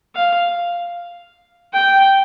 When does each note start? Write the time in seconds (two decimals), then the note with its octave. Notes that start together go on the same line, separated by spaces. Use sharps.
0.15 F5
1.74 G5